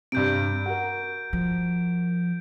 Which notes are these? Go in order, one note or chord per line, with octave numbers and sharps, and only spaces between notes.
G2 C3 G6 D7
F#4 A#4
F3